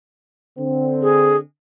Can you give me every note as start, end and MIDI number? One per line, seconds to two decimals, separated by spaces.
0.59 1.41 50
0.59 1.41 60
1.02 1.36 68